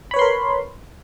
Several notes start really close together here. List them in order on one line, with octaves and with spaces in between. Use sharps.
B5 C#5 B4 C6 A#4